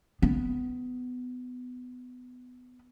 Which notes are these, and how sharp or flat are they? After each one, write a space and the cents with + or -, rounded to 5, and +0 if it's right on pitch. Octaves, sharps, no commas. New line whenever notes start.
B3 +20